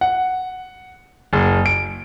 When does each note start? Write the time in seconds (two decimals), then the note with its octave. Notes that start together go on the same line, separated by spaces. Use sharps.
0.01 F#5
1.33 F#1
1.66 D7